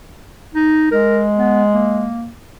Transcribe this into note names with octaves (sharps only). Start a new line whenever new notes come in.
D#4
G#3 A#4
B3
A#3